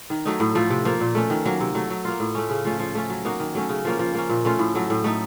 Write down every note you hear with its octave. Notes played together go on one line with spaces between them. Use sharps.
D#3
F#3 A3 D#4
A2
F3 A3
C3
F3 A#3
A#2
A3 C#4
D#3
F#3 A#3
C3
F#3 A3
F#3
A#3 F4
A2
A3 C#4
C#3
F3 A3 C#4
F3
A3 C#4
F#3
A#3 D#4 F#4
D#3
F#3 A3 C#4
C#3
F3 A#3 C#4
F3
A#3 C#4
A#2
A3 C#4 F4
A2
F#3 A3
A2
A3 D#4